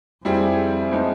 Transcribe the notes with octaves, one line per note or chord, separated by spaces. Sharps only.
F2 G3 C4 E4 G#4
F3 G#3 B3 D#4